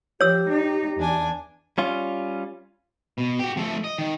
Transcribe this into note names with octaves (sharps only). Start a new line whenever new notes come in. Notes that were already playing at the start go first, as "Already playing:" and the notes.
F3 G4 C#5 E6
D#4
E2 D4 G#5
G3 C#4 F4
B2
F#4 G4
F3 A3
D#5
D#3